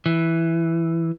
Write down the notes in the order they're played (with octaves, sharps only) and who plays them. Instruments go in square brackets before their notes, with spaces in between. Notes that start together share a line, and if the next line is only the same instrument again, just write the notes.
[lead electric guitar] E3